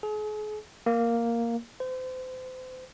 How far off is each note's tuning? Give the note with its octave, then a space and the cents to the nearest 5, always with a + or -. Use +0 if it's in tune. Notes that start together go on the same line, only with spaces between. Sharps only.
G#4 +40
A#3 +0
C5 -35